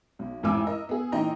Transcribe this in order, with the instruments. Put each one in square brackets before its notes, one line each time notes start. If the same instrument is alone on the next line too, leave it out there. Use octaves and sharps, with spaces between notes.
[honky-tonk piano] B1
A1 F2 G#2 G#5 D6 E6
A#4 D#5
B3 G#4
A#2 E3 D#4 D#5 G5 A#5